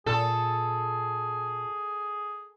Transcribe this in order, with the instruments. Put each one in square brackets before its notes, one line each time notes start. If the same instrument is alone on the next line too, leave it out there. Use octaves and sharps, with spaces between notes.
[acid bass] A#2 [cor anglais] G#4 [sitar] A4